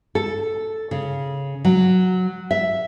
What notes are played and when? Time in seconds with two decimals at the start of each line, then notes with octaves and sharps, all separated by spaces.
0.15 A4
0.91 C#3
1.65 F#3
2.51 E5